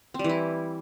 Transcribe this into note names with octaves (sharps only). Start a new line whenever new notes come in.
E3 G3 C4 E4